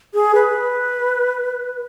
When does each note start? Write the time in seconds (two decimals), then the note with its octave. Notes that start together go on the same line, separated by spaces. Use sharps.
0.14 G#4
0.35 B4